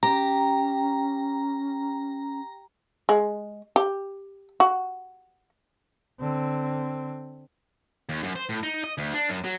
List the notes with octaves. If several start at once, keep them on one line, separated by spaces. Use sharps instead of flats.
C#4 G4 A#5
G#3
G4
F#4
D3 C4
D#2
F#2
C5
A2
D#4
D#5
D2
D4
F#2
F#3